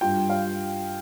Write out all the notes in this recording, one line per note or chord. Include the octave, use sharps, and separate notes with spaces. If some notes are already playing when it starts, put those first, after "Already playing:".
G2 G3 F4 G5
F5